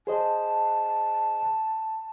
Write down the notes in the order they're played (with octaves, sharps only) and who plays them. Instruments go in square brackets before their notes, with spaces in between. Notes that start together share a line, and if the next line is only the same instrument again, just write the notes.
[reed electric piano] G#4 C5 D#5 [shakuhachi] A5